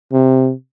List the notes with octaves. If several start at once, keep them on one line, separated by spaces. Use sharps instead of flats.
C3